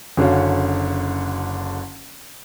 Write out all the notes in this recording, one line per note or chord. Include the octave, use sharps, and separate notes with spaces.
F#1 D3 C#4 F#4 F5